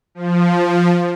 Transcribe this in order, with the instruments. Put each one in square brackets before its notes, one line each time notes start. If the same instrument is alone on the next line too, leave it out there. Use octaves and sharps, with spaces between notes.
[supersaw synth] F3